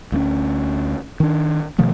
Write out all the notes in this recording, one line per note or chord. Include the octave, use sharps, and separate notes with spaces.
D2 A3 C#4
D#3 D4
B2 D#3 F3 A3